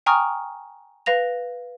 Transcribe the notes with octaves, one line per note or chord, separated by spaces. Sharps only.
G5 G#5 A#5 C#6 D#6 F6
B4 F5 A#6 F7